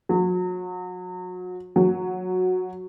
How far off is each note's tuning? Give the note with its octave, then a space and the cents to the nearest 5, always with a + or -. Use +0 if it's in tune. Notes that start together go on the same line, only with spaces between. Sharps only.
F#3 -35
F#3 -10